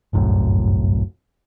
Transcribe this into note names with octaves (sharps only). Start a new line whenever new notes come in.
G1 C2 F#2 A2